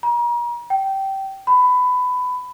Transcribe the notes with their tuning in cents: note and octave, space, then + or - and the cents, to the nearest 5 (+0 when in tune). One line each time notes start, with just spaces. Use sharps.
A#5 +40
G5 -15
B5 +20